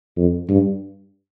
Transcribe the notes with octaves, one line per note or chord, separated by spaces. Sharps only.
F2
G2